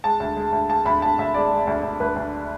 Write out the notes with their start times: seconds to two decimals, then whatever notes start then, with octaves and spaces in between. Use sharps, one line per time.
0.04 G#3 A5
0.20 D2
0.36 G#3
0.53 D2
0.69 G#3 A5
0.85 D2 B5
1.02 D2 A5
1.19 D2 E5
1.34 G#3 D5
1.51 G#3
1.67 D2
1.83 D2
2.00 D2 B4
2.16 D2